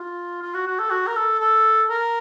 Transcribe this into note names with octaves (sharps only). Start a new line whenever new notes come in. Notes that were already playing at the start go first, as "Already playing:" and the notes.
Already playing: F4
F4
F#4
F#4
A4
F#4
A#4
A4
A4
A#4